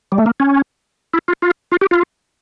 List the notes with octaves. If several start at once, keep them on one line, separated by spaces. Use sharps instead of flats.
G3
A3
A#3
C#4
E4
F4
F4
F4
G4
F4